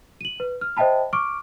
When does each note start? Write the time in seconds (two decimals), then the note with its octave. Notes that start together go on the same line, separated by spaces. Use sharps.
0.21 D#7 F#7
0.40 B4
0.61 F6
0.77 C5 D#5 E5 G5 A5 B5
1.13 C#6 D6 F6 D7